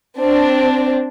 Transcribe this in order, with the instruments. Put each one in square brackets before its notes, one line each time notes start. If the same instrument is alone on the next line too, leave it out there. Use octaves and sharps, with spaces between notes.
[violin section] C4 D4